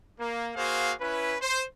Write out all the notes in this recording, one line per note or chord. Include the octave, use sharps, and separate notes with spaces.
A#3
A#3 F#4 G#4 C5 F5
C#4 E4 B4
C5